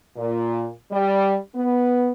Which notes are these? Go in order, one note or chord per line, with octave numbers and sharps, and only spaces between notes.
A#2
G3
B3